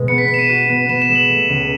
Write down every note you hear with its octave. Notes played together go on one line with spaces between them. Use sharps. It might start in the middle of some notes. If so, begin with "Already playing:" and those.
Already playing: B2 G#3
B3 C#7
B6
B3 C#7
E7
D#7
F#4
B3
B3 E7
E7
G#3
F#7
A3
C#2